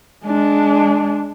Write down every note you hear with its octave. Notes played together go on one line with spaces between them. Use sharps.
G#3 D4